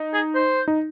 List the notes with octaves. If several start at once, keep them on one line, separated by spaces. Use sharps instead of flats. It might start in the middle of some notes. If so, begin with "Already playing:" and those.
Already playing: D#4
G#4
C5
D#4